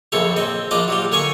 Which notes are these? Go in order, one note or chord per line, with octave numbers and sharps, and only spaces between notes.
A#1 F#2 C#3 A4 C#5
C4 D#5
A#1 D4 F4 D#5 D6
F#3 G3 F4
D3 A#3 C#5 G#5 C#6 D#6